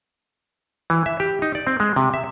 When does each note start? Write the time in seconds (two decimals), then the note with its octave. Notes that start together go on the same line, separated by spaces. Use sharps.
0.90 E3
1.06 E5
1.20 G4
1.42 D#4
1.55 D5
1.67 C4
1.80 G#3
1.96 C3
2.14 E5